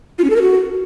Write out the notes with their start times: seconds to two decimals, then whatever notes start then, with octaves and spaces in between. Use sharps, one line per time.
0.19 F4
0.24 C#4
0.30 A4
0.36 A#4
0.42 F#4